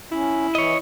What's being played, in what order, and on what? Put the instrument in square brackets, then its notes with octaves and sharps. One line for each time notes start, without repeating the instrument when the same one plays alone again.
[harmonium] C#4 [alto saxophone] E4
[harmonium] E3 [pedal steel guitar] C#5 D#5